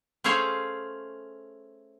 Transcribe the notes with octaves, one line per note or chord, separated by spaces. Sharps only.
A3 C#4 G#4 C5 C#5 F5